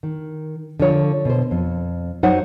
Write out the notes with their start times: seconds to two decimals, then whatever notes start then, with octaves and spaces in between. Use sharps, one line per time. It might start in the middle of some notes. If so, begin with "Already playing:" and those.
0.03 D#3
0.80 D3 F3 C#5
1.25 B2 C5
1.51 F2
2.23 F#2 F#3 D#4 C5 C#5 F#5